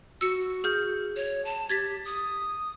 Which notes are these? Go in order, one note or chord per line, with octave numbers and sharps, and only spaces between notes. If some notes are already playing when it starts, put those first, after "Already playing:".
F#4 E6 C#7
G#4 F6 G6
C#5
A5
G4 G#6 A6 B6
D#6